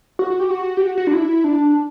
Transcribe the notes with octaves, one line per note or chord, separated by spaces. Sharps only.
F#4
F#4
G4
F#4
G4
F#4
F#4
D4
E4
D4